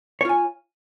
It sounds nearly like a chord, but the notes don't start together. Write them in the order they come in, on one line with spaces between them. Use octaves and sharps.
C#5 F4 G#5